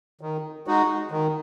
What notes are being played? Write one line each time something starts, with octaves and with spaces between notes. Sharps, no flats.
D#3
G#3 D#4 F#4
D#3